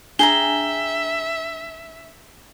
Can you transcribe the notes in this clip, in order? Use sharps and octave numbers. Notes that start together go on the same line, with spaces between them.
D4 G#4 E5 G5 A#5 G7